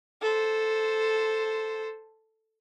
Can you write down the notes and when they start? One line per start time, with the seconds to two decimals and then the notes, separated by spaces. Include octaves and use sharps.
0.22 A4 C5